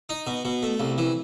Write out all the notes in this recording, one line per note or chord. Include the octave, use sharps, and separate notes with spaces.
D#4
B2
B2
A3
C2
E3